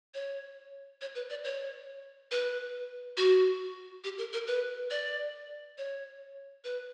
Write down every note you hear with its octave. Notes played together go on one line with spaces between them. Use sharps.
C#5
C#5
B4
D5
C#5
B4
F#4
G4
A#4
A#4
B4
D5
C#5
B4